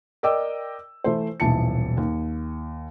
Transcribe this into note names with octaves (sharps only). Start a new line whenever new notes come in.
A#4 D5 D#5 G5 D6 E6
E3 A3 C5
D#1 B1 E3 A5 C#7
D#2